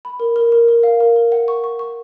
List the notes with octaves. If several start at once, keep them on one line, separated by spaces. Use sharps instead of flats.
B5
A#4
A#4
A#4
A#4
F5
A#4
A#4
F#5
C#6
C#6
C#6